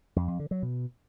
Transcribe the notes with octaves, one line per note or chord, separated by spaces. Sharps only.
F2
F2
D3
F#3
B2